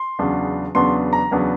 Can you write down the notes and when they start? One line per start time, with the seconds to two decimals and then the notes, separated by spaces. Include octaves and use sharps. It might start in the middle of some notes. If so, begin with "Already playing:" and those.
Already playing: C6
0.19 E2 C#3 F#3 B3 D4
0.75 E2 C#3 F#3 B3 D4 C6
1.13 A#5
1.31 E2 C#3 F#3 B3 D4